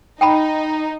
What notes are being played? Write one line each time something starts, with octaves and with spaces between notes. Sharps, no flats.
D#4 G5 A5 B5